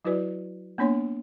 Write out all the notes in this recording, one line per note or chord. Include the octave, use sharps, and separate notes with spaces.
F#3 E4 F#4 B4 D5
A#3 B3 D4 C#5 C6